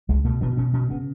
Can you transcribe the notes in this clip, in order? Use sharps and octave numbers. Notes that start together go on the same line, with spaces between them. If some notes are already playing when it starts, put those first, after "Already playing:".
C#2 G#3
B2 A3
B2 B3
B2 C#4
B2 C#4
C#3 B3